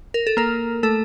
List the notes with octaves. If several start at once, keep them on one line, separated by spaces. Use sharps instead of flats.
A#4
A4
A#3 A#4
A3 A4